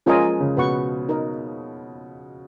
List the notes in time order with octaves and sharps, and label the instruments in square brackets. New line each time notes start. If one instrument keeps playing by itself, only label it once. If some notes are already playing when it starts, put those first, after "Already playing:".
[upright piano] F3 G#3 [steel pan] C#4 F4 A#4 D#5 G#5
[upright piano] C#3
[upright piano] B2 [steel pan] B4 F#5 C#6
[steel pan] D#4 A#4 D#5